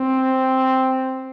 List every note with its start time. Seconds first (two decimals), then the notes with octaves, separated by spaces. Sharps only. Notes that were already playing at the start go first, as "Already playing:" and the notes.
Already playing: C4